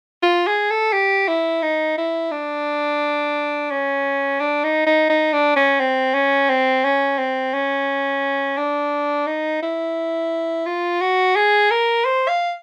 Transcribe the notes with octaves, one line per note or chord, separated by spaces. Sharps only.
F4
G#4
A4
G4
E4
D#4
E4
D4
C#4
D4
D#4
D#4
D#4
D4
C#4
C4
C#4
C4
C#4
C4
C#4
D4
D#4
E4
F4
F#4
G#4
A#4
C5
F5